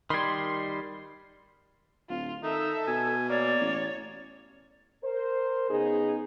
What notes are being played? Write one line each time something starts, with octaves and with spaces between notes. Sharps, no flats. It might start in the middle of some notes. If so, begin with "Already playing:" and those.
D#3 G3 B5 C6 G#6
D1 F4
D#3 D#4 A4 E5
B2 G#5
A#3 C#5 D5
A1
A#4 C5
C#3 B3 D#4 G#4